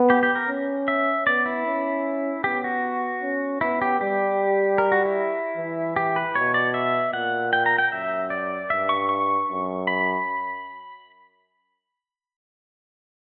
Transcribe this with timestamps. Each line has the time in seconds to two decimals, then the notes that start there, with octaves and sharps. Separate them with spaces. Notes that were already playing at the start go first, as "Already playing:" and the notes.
Already playing: B3
0.10 G4
0.23 G4
0.35 A#4
0.49 C#4
0.88 E5
1.27 B3 D5
1.46 E4
1.66 C#4
2.44 B3 G4
2.64 F#4
3.23 C#4
3.61 B3 E4
3.82 G4
4.00 G3 G4
4.78 A#4
4.92 F#4
5.05 E4
5.57 E3
5.96 G4
6.16 B4
6.35 B2 C#5
6.54 D5
6.74 E5
7.13 A#2 F#5
7.53 G5
7.66 A#5
7.78 G5
7.92 F#2 E5
8.30 D5
8.70 G2 E5
8.89 C#6
9.09 C#6
9.48 F#2
9.87 B5